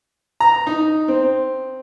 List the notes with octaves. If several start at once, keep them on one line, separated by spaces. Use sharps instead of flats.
A#5
D#4
C4